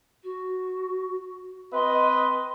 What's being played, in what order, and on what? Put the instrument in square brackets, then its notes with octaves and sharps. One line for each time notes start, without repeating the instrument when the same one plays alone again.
[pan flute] F#4
[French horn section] C4 D#5 [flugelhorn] B4 [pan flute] C6